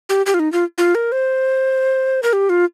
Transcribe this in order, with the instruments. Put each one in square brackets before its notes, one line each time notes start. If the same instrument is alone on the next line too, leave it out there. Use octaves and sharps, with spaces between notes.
[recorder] G4
G4
F4
D#4
F4
F4
A#4
C5
A#4
G4
F4